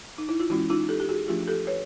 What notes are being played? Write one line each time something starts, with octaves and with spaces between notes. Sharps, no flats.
D#4
E4
F4
E3 G#3 C#4 E4 F#4
D#4 F4
G4 A4
G4
F#4 G#4
F3 A3 D4 F4 G4
G4 A4
B4 C#5